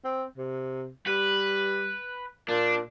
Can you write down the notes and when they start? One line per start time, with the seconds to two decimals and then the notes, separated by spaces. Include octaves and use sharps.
0.05 C4
0.37 C3
1.07 G3 B4
2.49 A#2 D4